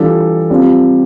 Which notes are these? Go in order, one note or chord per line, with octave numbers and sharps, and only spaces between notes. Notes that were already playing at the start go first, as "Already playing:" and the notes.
Already playing: E3 G3 D4 F4 A4
G3 C4 F4